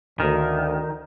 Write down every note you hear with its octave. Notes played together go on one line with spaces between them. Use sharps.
D2 D#3